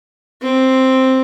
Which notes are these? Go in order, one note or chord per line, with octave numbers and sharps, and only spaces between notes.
C4